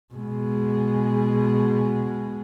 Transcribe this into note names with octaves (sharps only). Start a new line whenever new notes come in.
B2 G#3